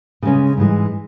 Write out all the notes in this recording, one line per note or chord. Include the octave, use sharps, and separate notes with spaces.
C#3 G#3 C#4
G#2 E3 G#3